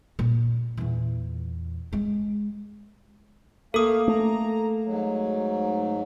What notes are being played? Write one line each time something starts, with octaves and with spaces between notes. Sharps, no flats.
A#2 D4
E2 A#2
G#3
A3 A#3 A4 F5 D#6
A3 A#5
G#2 F#3